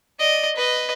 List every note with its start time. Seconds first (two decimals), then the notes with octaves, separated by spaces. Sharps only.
0.19 D5 D#5
0.56 B4 D#5